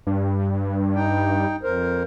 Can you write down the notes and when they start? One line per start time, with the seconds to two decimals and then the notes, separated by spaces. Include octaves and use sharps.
0.07 G2
0.95 D#4 G5
1.63 F2 A#4 C5